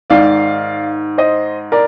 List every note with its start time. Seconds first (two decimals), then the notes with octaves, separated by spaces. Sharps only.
0.10 G#2 D#3 D5 F5
1.18 C5 D#5
1.72 A#4 D5